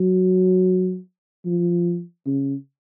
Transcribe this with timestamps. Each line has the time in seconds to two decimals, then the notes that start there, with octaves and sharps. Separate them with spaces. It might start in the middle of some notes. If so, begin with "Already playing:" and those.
Already playing: F#3
1.46 F3
2.26 C#3